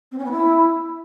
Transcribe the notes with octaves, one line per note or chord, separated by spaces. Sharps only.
C4
C#4
B3
E4